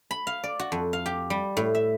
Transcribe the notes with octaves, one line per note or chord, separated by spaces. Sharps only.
B5
F5
D5
F#4
F2
F5
G4
G3
A2
E5